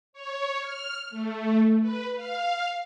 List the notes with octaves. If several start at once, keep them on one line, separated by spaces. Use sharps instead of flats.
C#5
F6
A3
B4
F5